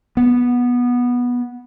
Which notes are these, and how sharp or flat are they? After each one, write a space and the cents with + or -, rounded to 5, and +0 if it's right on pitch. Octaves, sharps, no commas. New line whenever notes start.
B3 -15